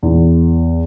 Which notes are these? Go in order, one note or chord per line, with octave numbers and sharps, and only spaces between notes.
E2